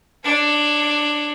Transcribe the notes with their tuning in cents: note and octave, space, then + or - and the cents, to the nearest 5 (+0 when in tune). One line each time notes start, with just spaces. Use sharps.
D4 +10 C#5 -10